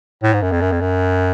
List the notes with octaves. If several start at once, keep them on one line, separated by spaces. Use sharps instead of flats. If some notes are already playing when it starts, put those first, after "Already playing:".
A2
G#2
F#2
F2
F#2
F2
F#2